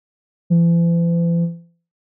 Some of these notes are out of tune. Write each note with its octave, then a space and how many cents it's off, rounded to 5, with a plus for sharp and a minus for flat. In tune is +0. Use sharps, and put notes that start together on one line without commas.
E3 +45